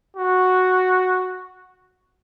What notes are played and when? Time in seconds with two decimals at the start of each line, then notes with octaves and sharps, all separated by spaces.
0.17 F#4